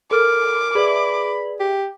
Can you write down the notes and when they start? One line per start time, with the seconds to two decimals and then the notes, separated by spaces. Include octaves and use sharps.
0.11 A4 A#4 D6 F6
0.75 G#4 B4 D5 E5 B5 F#7
1.60 G4